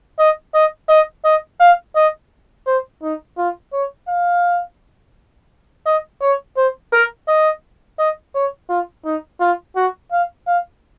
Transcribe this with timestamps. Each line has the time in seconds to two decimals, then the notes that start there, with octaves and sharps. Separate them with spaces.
0.19 D#5
0.54 D#5
0.89 D#5
1.25 D#5
1.60 F5
1.96 D#5
2.66 C5
3.03 D#4
3.38 F4
3.73 C#5
4.08 F5
5.86 D#5
6.22 C#5
6.57 C5
6.92 A#4
7.28 D#5
7.99 D#5
8.35 C#5
8.69 F4
9.05 D#4
9.40 F4
9.76 F#4
10.12 F5
10.47 F5